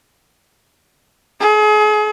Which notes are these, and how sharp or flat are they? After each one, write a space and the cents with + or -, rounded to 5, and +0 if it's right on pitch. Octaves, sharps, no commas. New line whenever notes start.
G#4 +35